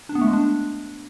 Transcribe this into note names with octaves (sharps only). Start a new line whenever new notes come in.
D4
B3
A3
G#3
D4